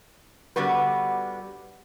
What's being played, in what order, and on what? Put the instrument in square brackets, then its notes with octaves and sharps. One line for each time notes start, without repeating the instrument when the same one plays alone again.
[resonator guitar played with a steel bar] D3 G3 B3 F#4 B4